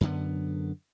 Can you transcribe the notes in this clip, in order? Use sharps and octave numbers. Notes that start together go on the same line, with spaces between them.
F#2 D3 B3